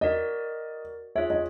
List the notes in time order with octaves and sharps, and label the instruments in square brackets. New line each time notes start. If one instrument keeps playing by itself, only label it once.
[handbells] F#4 A#4 D5 [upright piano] D#5
[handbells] F4 G#4 C#5 [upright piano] E5
[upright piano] D#5